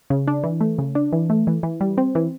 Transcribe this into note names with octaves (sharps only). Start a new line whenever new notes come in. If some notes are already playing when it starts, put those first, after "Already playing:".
C#3
D4
E3
A3
C#3
D4
E3
A3
E3
E3
G3
C4
E3